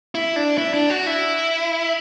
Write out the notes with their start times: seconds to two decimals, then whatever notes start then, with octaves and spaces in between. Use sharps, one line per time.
0.15 E4
0.36 D4
0.58 E4
0.74 D4
0.90 F#4
1.07 E4